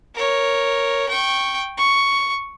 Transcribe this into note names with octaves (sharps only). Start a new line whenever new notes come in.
A#4 C#5
G5 C#6
C#6